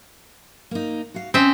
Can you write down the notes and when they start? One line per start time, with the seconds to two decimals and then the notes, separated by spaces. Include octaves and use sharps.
0.71 A#3 D#4
1.14 F#4 F5
1.34 C4 C#4 D#5 E5